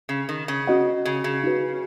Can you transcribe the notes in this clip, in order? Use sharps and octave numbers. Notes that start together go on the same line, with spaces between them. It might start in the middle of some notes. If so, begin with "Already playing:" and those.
C#3
D#3
C#3
C#4 F#4 D#5 F#5
C#3
C#3
D#4 F#4 B4